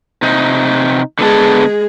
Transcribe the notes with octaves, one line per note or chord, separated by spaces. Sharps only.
C3 D#4
D3 G#3 B3 G#4 A5